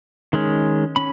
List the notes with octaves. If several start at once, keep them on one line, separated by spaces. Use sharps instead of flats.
D#3 G#3 C#4
C#4 B5